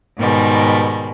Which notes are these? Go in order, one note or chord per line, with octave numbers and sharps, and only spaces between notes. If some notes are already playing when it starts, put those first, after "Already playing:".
G#2 B2 D#3 G3 G#3